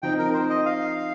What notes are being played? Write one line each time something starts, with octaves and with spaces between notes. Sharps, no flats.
F3 C4 D#4 G5
A#4
C5
D#5
F5